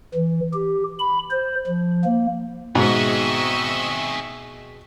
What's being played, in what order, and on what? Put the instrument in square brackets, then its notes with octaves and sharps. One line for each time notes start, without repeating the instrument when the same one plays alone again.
[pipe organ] E3
G4
B5
C5
F3
A#3
[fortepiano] G#2 [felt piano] B2 G#3 [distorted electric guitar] C4 G#4 [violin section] D#5 E5 C#6